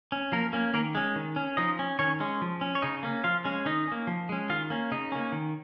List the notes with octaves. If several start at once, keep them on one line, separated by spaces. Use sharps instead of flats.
C#4
F3 A#3 A#4
A#3 C#4
D#3 A#3 A#4
G#3 C#4
D#3
C#4
F3 D#4 D#5
C#4
D#3 C#4 C#5
G#3 C#4
F3
C#4
C#5
C#3 D#4 D#5
A#3 C#4
F3 F4 F5
G#3 C#4
D#3 D#4 D#5
A#3 C#4
F3
G#3 C#4
D#3 F4 F5
A#3 C#4
C#3 D#4 D#5
A#3 C#4
D#3